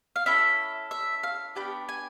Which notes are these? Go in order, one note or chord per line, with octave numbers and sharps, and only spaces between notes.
F5
C#4 E4 A4 E5
E5
F5
B3 D4 G4 G5
G#5